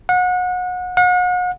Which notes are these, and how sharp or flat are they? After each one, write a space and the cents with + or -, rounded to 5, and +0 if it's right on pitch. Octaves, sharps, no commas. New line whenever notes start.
F#5 -30
F#5 -40